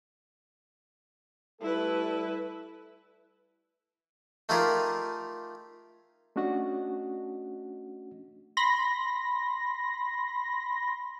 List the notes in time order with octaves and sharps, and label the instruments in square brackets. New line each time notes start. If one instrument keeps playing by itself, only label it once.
[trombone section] G3 A3 A4 [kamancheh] E4 B4
[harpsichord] A3 D#4 F4 G4 G#4 A#4
[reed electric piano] A3 C#4 D4 F#4 D#5 F#5
[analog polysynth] B5 C6 A#6